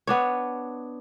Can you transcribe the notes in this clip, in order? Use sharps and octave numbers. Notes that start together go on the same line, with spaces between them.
B3 D4 C#5